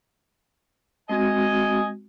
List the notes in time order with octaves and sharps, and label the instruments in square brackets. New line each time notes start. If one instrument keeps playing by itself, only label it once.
[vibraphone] G#3 C4 F#4 [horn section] D#5 G#5